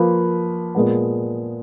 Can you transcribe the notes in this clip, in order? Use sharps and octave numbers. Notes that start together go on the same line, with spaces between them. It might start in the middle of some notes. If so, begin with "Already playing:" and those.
Already playing: F3 A#3 F4 B4
A#2 G#3 B3